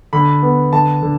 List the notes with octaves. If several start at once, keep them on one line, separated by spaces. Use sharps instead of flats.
D3 B5
B3
D3 A5
D3